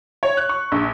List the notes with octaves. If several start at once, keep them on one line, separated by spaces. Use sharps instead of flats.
C#5
F#6
C#6
A#1